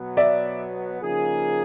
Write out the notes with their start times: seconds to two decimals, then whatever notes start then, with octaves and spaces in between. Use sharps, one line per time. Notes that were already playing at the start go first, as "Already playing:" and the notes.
Already playing: B2 F#3 B3
0.17 D5 E5
1.01 C#3 F3 A#3 D#4 G#4